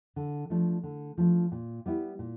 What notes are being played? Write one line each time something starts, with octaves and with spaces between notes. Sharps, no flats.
D3
F3 A3 D4
D3
F3 A3 D4
A#2
G3 B3 E4
A#2